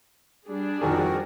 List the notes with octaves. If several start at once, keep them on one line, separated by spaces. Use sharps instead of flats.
G3 D4 G#4
F2 D#3 C4 F#4 A#4 G#5